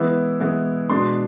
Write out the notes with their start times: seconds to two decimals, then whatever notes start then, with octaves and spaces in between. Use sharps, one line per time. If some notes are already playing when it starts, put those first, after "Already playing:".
Already playing: E3 G#3 B3 E4
0.40 E3 G#3 B3 E4
0.90 B2 G#3 D4 C6